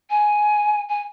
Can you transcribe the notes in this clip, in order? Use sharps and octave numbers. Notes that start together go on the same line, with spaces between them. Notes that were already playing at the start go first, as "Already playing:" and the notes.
G#5
G#5